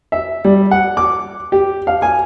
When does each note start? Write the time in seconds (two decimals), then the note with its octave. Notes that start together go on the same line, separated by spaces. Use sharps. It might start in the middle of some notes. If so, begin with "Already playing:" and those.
0.12 E5
0.45 G3
0.71 F#5
0.97 D6
1.52 G4
1.87 F5
2.02 G#5